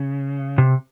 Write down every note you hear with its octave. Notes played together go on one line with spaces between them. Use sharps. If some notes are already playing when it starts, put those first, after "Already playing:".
Already playing: C#3
C3